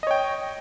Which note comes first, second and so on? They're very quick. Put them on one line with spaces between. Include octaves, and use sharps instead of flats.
D#5 C#5 G5